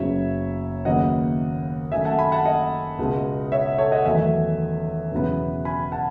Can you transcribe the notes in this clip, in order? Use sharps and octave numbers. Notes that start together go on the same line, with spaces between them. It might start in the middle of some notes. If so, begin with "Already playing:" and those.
Already playing: F#1 F#2 C#3 F#3 B3 C#5 E5
D#2 C#3 F#3 B3 D#5 F#5
F#2 D#3 A3 E5 G#5
F#5 A5
G#5 B5
F#5 A5
D#5 F#5
C#2 B2 G#3
C#5 E5
A4 C#5
D#5 F#5
E2 D#3 F#3 A3 E5 G#5
E1 E2 C#3 F#3 B3
G#5 B5
F#5 A5